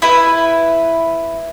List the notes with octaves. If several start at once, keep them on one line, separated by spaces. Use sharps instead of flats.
E4 B4